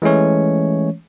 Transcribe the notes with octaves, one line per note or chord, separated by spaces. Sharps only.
E3 G#3 A3 C#4 C#5